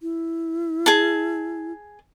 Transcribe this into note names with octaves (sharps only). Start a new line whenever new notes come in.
E4
G#4 A5